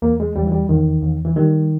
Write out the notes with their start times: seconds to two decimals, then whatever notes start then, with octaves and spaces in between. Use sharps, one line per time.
0.02 E2 A#3
0.20 G#3
0.36 E2 G3
0.47 E3
0.52 G3
0.69 E2 D#3
1.02 E2
1.25 E3
1.36 D#3 G3